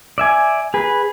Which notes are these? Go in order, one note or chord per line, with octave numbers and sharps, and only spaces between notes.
D5 E5 G#5
G#4 B4